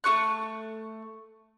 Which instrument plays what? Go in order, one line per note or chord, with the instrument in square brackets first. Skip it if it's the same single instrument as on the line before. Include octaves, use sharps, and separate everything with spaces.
[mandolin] A3 F4 C#6 F#6